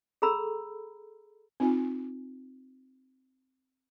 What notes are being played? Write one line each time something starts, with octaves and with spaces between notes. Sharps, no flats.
G#4 A4 A#5 B5 E6
C4 D#4 F4 G#5